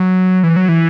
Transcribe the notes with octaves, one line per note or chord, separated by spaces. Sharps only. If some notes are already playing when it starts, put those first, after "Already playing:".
Already playing: F#3
E3
F#3
E3